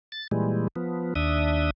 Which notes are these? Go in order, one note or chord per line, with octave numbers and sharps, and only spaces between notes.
A6
A#2 E3 G3 G#3
F3 B3
D#2 D4 E5 D#6